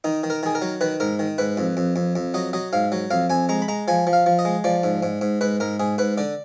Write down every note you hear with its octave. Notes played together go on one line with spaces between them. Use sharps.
D#3 D#4
D#3
A#4
D#3 G#4
A#4
F#3
D#3 B4
G#2 A#4
D#3
G#2 B4
F2
F2
F2
F2
F#3 D#5
F#3 D#5
G#2 F5
F#3
F2 F5
F2 G#5
G#3 A#5
B5
G#3 A#5
F3 G#5
F3
F5
F3
D#5
G#3
F3 D5
G#2
G#2
G#2
G#2 B4
G#2 A#4
G#2 G#4
G#2 B4
D3 D5